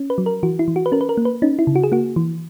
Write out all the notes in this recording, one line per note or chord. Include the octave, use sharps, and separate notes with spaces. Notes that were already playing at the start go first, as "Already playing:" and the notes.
Already playing: C#4
B4
F#3
A#4
E3 F#4
E4
E3
F#4
B4
C#4 A#4
B4
A#4
A#3
B4
C#4 D#4
E4
C#3
F#4
G#4
A#3 F#4
E3